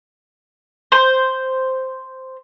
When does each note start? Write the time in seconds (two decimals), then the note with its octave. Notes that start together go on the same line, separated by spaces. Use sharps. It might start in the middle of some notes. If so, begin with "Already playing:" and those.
0.92 C5